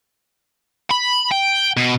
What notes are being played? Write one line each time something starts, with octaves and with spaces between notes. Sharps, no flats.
B5
G5
B2